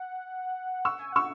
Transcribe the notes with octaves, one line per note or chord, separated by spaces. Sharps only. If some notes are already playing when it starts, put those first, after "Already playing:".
Already playing: F#5
C#6 E6
G#5
F#5 C#6 E6